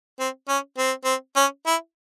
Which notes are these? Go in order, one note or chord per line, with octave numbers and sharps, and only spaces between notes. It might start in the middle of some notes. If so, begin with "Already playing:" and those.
C4
C#4
C4
C4
C#4
E4